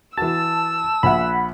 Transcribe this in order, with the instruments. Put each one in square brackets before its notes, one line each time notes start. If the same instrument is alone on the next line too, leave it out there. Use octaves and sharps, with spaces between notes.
[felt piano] E3 F#4 [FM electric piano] A5 [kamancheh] E6
[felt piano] A#1 E5 [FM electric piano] F#5 B5